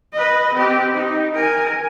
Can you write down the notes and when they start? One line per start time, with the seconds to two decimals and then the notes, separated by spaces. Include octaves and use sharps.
0.13 B4 D#5
0.54 C4 G4
0.94 D#4
1.35 A#4 G#5